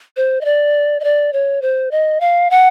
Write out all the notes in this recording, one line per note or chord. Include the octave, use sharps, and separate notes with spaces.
C5
D#5
D5
D#5
D5
C#5
C5
D#5
F5
F#5